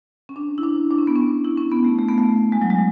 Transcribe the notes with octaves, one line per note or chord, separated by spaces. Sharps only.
C#4
D4
E4
D4
D4
C#4
B3
C#4
E4
C#4
B3
A3
A3
B3
A3
G#3
F#3
G#3